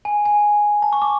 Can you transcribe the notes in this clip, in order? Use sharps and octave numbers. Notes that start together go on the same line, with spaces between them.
G#5
G#5
A5
C#6
D6